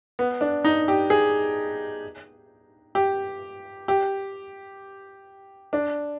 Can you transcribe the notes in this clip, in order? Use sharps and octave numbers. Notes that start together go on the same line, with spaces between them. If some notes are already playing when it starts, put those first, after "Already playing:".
B3
D4
D#4
G4
G#4
G4
G4
D4